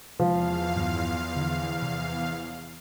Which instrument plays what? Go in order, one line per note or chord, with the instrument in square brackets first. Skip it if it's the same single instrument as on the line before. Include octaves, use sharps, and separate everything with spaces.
[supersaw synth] E2 F5 [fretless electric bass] C3 G#3 [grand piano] F3
[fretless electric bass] G2 D#3 F#3
D3
C3